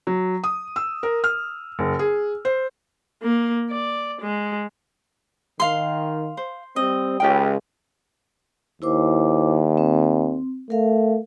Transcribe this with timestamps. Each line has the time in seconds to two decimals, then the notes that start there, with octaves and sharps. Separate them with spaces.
0.07 F#3
0.44 D#6
0.76 E6
1.03 A#4
1.24 F6
1.79 F#1
1.99 G#4
2.45 C5
3.22 A#3
3.70 D5
4.21 G#3
5.60 D#3 F5 C6
6.37 C5
6.76 G3 C4 D#5
7.20 C#2 G4 A#4 G5
8.82 D#2 E4 C5 D6
9.77 C4
10.70 A3 A#4 F5